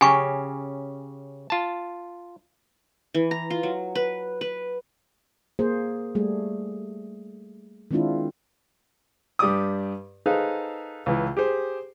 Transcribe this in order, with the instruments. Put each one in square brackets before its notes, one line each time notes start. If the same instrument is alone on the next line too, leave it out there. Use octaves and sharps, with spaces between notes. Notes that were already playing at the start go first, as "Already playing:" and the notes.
[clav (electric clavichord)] C#3 C#4 G4 [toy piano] G#5 C#6
[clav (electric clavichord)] F4 A5
[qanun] E3
A#5
F4
F#3
B4
B4
[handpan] A#3 G#4 C5
G3 A3 G#4
D#3 G#3 C4 D4 E4 F4
[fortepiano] G2 G4 D5 D6 D#6
D#4 G#4 A4 B4 C5 F5
C#2 E3
G4 G#4 C5